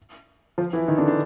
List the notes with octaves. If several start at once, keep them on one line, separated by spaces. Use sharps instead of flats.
F3 F4
E3 E4
D#3 D#4
D3 D4
D3 D4